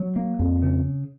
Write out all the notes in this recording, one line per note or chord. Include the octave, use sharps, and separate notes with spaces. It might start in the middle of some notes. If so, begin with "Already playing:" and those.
Already playing: F#3
A#3
F2
C#3